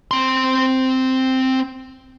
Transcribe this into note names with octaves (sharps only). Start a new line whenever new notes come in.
C4 C6